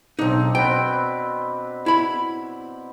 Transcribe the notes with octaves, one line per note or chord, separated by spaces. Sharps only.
B1 C4 D4 D#4
B2 C4 B4 G5
E4 B5